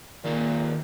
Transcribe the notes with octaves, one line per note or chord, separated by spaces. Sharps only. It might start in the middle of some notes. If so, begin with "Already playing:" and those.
A#2 D#3 A#3 D#4 G#4